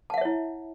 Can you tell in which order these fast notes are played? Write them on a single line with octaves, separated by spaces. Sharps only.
A5 F#5 E5 C#5 E4